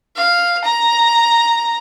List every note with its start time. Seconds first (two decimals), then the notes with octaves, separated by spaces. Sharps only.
0.16 F5
0.64 A#5